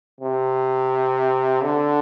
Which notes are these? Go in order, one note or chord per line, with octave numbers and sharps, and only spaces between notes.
C3
D3